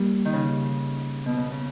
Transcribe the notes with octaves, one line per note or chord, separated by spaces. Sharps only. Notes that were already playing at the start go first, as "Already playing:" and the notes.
Already playing: G3 A#3
D#3
C#3
B2
C#3
C#3